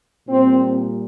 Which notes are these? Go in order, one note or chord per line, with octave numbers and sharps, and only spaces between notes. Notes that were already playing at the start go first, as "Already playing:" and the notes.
A#2 G3 C4